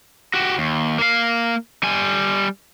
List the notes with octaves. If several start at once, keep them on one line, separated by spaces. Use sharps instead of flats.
F#4 G4
D#2
A#3 F5
G3 G#5